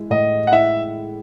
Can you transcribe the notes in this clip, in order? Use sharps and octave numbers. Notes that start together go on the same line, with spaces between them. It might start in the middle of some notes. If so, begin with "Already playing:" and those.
Already playing: G#3 E4
A2 D#5
F#5
E4 E5